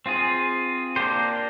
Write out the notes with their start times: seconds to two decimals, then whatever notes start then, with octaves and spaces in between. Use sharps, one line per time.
0.06 C4 F4 G#4
0.96 A#3 D4 G4 C5